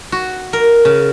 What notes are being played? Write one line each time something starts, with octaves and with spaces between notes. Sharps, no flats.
F#4
A#4
C#3